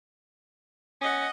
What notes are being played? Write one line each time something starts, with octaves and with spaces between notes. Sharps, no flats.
C#4 D#5 F#5